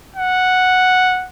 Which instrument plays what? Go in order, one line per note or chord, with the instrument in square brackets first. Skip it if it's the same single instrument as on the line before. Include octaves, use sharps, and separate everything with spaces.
[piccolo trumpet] F#5